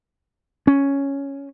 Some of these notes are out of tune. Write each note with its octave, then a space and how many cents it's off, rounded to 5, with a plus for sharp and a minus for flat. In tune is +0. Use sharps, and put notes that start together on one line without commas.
C#4 +0